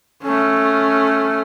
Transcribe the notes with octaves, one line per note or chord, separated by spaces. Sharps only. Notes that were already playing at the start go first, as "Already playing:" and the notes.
A3 C#4